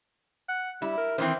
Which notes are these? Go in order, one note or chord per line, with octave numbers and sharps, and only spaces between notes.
F#5
G3 E4
A#4
D#3 E3 C4 C5